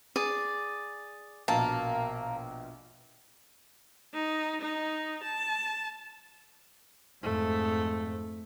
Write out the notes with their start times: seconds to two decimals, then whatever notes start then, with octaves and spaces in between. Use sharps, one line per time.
0.16 G#4 D5
1.48 A#1 B2 A#3 A5
4.14 D#4
4.62 D#4
5.24 A5
7.23 F2 G#2 A3